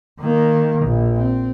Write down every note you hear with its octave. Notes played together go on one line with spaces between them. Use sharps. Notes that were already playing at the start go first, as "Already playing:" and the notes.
D#3 A#3
A#1
C4